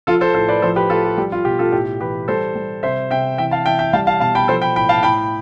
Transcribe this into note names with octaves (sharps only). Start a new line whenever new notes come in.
F3 F4 A4
A4 C5
A2 A4 C5
B4 D5
F3 A4 C5
G4 B4
F3 F4 A4
G4
G3 G4
F4
B2 G4
F4 A4
A2 G4
E3 G4 B4
G3 A4 C5
G3
C3 C5 E5
C3 E5 G5
E3 E5 G5
F5 A5
E3 E5 G5
E5 G5
G3 F5 A5
F5 A5
B2 F5 A5
G5 B5
F3 A4 C5
G5 B5
A2 G5 B5
F5 A5
A2 G5 B5